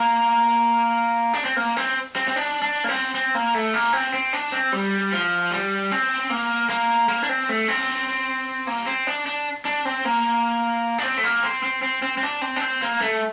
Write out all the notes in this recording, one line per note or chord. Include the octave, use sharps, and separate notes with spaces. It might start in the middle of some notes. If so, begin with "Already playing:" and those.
Already playing: A#3
D4
C4
A#3
C4
C4
C4
D4
D4
A#3
C4
C4
A#3
A3
A#3
C4
C4
D4
C4
G3
F3
G3
C4
A#3
A#3
A#3
D4
C4
A3
C4
A#3
C4
D4
D4
D4
C4
A#3
D4
C4
A3
A#3
C4
C4
C4
C4
C4
D4
C4
D4
C4
A#3
A3